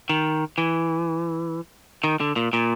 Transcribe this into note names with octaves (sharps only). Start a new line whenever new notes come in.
D#3
E3
D#3
D3
A#2
A#2